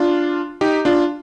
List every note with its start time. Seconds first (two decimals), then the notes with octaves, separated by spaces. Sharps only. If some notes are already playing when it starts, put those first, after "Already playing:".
Already playing: D4 F4
0.61 D#4 G4
0.85 D4 F4